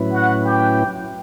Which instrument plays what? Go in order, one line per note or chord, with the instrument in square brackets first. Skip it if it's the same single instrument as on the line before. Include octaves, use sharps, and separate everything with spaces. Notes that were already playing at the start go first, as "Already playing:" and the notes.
Already playing: [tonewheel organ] A2 F#3 C#4 E4 B4
[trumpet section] F#4 F#5
G4 G5